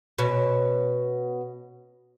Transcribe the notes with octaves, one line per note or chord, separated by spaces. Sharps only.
B2 C#4